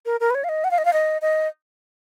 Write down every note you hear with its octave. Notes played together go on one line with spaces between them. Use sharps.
A#4
A#4
B4
C#5
F5
D#5
F#5
F5
D#5
F5
D#5
D#5